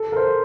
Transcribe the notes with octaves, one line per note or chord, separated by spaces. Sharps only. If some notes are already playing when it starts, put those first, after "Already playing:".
Already playing: A4
A#4
C5